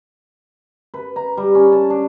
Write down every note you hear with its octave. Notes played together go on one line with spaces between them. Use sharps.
B4
A#5
G3
C#4
A5
D4